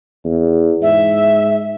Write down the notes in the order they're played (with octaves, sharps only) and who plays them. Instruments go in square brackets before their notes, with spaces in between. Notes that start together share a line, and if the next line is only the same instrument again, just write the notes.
[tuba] E2
[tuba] G#2 [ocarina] E5